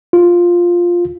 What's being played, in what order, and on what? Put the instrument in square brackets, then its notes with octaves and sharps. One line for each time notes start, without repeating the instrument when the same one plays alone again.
[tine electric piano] F4